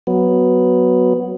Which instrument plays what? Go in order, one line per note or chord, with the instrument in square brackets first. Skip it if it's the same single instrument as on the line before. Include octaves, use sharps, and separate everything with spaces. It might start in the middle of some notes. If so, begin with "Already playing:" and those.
[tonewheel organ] F#3 B3